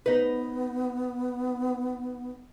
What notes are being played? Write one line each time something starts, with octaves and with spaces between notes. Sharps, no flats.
B3 D#4 B4